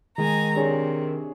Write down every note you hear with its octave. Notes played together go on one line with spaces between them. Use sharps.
D#3 G#3 G#5 A#5
C3 D4 G#4 C#5